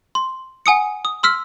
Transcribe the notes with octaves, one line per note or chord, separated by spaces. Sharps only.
C6
F#5 G#5 D#6 C#7
D#6
C6 E6 F6 B6